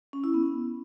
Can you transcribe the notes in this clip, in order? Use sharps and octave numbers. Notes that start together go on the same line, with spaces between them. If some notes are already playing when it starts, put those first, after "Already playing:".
C#4
E4
B3